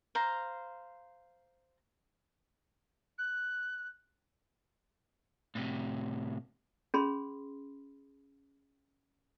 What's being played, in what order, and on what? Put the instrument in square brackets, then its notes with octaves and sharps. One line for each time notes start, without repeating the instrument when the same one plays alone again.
[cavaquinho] C5 F5 A#5
[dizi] F#6
[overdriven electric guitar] A2 C3
[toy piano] C#4 G#4 B5 C6